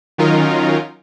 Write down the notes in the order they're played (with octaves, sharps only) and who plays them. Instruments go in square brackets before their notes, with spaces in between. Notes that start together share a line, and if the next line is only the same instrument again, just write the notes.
[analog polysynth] D#3 F#3 C#4 D#4 F4 A#4